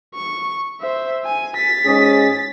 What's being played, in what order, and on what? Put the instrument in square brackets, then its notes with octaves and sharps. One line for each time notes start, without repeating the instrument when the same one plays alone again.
[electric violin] C#6
C5 E5
G#5
A6 B6
[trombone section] G#2 C#4 G#4